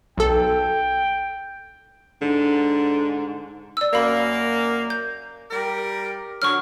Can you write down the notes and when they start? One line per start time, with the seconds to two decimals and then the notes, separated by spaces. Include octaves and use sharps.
0.17 B1 A4 G5
2.22 G#2 D3
3.77 D5 E6
3.94 F#2 A#3 F5 B5
4.90 G6
5.51 G3 G4 A#4
6.42 D3 F#3 C#6 F6